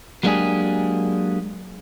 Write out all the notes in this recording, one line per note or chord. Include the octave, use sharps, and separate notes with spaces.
F#3 G#3 A#3 D4 G4 G#4